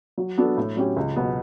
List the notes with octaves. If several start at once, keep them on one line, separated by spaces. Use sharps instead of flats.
F#3
B3 D4 F#4 A4
A2
F#3 C#4 G4
C#2
B2 F#3 B3